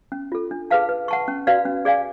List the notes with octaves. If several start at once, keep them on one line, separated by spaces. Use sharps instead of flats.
C#4
F4 A4
D4
G#4 B4 F5 A5
B4
F#5 A5 C#6
C#4
F#4 B4 D5 F5
C#4
G#4 D5 F5 G#5